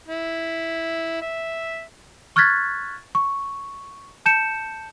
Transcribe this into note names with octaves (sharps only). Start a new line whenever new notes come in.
E4
E5
C#6 F6 F#6 G#6 A6 B6
C#6
A5 G6 C#7 E7